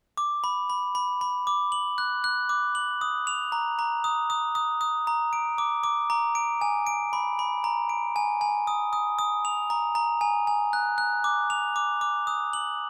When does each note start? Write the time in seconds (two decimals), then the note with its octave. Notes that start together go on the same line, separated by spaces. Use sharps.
0.17 D6
0.44 B5
0.70 B5
0.95 B5
1.21 B5
1.47 D6
1.72 F#7
1.98 F#6
2.24 F#6
2.49 D6
2.75 F#7
3.01 D#6
3.27 F7
3.52 A#5
3.79 A#5
4.04 D#6
4.30 D#6
4.55 D#6
4.81 D#6
5.07 A#5
5.33 D7
5.58 D6
5.84 D6
6.10 A#5
6.35 D7
6.61 G#5
6.87 D7
7.13 B5
7.39 B5
7.64 A#5
7.89 D7
8.16 G#5
8.41 G#5
8.67 D#6
8.93 D#6
9.19 D#6
9.45 F7
9.70 A#5
9.95 A#5
10.21 G#5
10.47 G#5
10.73 F#6
10.98 F#6
11.24 D6
11.50 F7
11.76 D6
12.01 D6
12.27 D#6
12.53 F#7